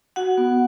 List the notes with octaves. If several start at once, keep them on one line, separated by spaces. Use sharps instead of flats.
F#4 F#5
B3